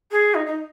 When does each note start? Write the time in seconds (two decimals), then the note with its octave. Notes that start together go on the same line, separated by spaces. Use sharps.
0.11 G#4
0.34 D#4
0.46 D#4